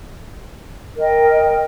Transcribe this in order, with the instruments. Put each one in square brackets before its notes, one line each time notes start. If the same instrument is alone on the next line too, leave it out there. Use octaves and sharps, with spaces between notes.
[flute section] A#4 D#5 G5